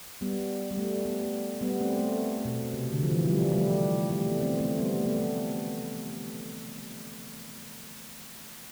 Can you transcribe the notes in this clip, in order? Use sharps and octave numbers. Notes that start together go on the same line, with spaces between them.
G3 B3
G3
A3
G3 B3
G3 B3
A3 C4
A3
B2
C3
D3
F3
E3
F3
G3
G3
A3
G3
A3
B3
A3 C4
A3 C4
G3 B3
A3
B3
A3